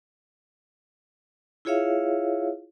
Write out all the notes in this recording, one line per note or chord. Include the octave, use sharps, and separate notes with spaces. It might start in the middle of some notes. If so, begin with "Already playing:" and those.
E4 F4 G#4 C#5 E5 F5